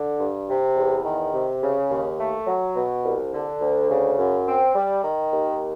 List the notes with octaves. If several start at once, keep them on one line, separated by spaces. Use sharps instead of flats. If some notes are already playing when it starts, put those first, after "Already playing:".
Already playing: D3
G2
C3
E2
D#3
C3
C#3
D#2
A3
F#3
B2
C2
D3
D2
C#3
F#2
C4
G3
D#3
D#2